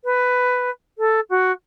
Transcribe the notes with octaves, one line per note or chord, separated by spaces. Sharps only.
B4
A4
F#4